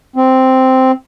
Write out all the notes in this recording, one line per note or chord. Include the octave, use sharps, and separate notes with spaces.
C4